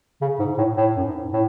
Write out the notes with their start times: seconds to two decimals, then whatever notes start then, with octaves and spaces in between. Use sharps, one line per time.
0.21 C#3
0.39 G#2
0.58 A2
0.77 A2
0.97 F#2
1.05 G#2
1.33 A2